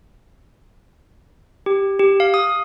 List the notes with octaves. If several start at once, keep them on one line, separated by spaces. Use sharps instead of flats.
G4
G4
F5
D#6